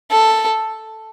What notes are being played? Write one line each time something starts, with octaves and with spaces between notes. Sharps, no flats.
A4